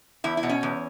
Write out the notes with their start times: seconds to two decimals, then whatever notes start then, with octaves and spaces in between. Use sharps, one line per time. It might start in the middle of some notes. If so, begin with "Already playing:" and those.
0.24 E2 E4
0.37 E4
0.43 B2
0.49 C#4
0.63 E2